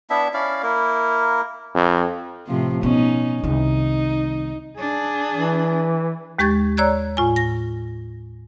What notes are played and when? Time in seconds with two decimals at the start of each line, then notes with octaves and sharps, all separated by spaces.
0.10 B3 D4 E4 E5
0.34 C#4 E4 D5 F5
0.63 A#3 E4 A#4
1.75 F2
2.47 A2 C3 F3
2.83 B2 C#4 D#4
3.43 C2 D#3 D#4
4.78 D4 G#4
5.32 E3
6.39 D#2 G#3 G4 C#6 G#6 A6
6.77 C#5 D5 A#5 E6 F#6 G#6
7.17 A2 F4 G#5
7.36 A#6